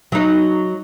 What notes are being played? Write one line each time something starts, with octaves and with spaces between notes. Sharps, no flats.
F#3 D#4